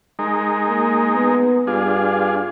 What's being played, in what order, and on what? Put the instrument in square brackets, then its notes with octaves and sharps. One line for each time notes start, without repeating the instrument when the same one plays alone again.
[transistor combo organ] G#3 D#4 A#4
[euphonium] A#3
B3
[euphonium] G2 [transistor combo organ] D4 F4 G#4